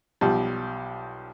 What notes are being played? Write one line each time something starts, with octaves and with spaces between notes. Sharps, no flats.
B1 F3 G3